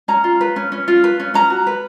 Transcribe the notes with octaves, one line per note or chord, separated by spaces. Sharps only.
C#4 A#5
F4
B4
C#4
C#4
F4
B4
C#4
C#4 A#5
F#4
B4